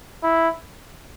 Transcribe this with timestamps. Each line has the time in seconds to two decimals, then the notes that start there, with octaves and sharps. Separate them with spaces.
0.23 E4